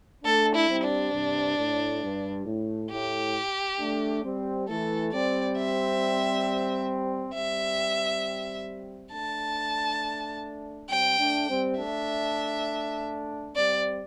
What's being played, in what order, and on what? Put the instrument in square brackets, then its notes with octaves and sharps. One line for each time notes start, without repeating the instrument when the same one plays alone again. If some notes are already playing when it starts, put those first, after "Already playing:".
[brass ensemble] A3 D4 [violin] A4
[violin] E4
[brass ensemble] G3 C4
[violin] D4
[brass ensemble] G2 C3
A2
G2
A2
[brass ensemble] A2 [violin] G4
[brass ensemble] A3 D4
G3 C4
[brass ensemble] E3 A3 [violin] A4
[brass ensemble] G3 C4 [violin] D5
[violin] E5
[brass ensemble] G3 C4 [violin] E5
[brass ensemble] A3 D4 [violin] A5
[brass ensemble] G3 C4 [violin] G5
[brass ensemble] A3 D4
G3 C4
[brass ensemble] A3 D4 [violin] E5
[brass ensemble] G3 C4 [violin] D5